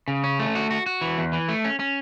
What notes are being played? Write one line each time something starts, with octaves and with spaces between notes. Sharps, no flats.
C#3
C#4
A3
F#4
F#4
F#4
E3
E2
E3
A3
C#4
C#4